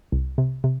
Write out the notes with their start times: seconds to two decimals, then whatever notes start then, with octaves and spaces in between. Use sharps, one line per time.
0.12 C2
0.38 C3
0.64 C3